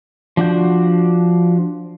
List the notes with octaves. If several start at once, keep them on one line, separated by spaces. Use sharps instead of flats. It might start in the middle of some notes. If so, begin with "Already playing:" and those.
F3 D4 F#4 G6